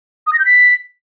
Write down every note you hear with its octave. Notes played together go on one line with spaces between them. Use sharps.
D#6
A#6
G6
B6